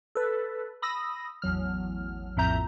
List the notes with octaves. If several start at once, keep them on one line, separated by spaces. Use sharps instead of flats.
A4 B4
B5 D#6 E6 A#6
A1 E2 F#3 F6
A#1 F2 A2 E5 A#5 G6